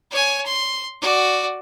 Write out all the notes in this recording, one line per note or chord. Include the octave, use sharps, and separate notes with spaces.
C#5 G#5
C6
F#4 D5